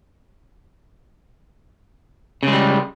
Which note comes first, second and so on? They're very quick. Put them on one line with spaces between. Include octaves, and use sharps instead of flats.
C#3 G#3 G3